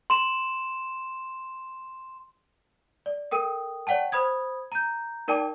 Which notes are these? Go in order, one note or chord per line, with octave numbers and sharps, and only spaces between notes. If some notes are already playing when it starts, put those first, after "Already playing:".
C6 E7
D5
A4 A#4 G5 D#6
C#5 D5 F#5 G5 A5
C5 B5 D#6 G#6
A#5 G6
D#4 A#4 D5 G5 A5 D6